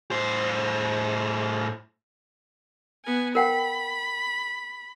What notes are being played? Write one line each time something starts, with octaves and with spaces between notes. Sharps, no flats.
A2 C5
B3 G#5
A#4 F#5 G5 B5